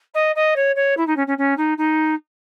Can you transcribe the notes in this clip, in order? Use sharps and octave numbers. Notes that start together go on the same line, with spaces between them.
D#5
D#5
C#5
C#5
E4
D#4
C#4
C#4
C#4
D#4
D#4